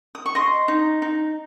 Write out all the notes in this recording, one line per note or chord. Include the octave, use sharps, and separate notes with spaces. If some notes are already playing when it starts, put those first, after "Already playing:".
D#6
C#6
D#5 C6
D#4
D#4